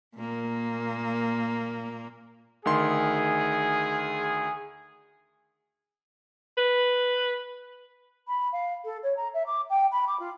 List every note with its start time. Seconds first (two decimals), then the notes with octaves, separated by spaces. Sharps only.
0.16 A#2 A#3
2.65 D2 D#3 G#4 C6
6.57 B4
8.27 B5
8.52 F5
8.84 A4
9.03 C#5
9.16 A#5
9.33 E5
9.46 D6
9.69 G5
9.91 B5
10.07 D6
10.19 F4